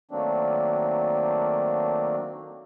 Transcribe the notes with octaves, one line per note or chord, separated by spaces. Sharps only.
D#3 F#3 A3 A#3 C4 D4